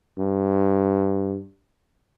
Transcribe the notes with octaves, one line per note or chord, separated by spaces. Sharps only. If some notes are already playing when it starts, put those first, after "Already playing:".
G2